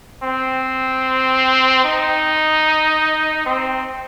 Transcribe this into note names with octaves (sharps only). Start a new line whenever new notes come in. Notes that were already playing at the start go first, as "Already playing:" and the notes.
C4
D#4
C4